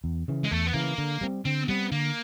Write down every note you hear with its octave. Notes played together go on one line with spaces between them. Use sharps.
E2
C#3 E3
G#3
E2 A3
B3
C#3 E3 A#3
D3
G3 C4
D3 C4
G3 B3 C4
D3 A#3